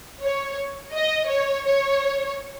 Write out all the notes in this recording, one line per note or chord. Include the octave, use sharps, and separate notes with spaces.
C#5
D#5
C#5
C#5